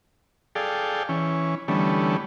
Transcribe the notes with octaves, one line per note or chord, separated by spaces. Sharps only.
G#4 A4 D5 F5 G5
E3 C#4
D3 E3 G3 A3 B3 C#4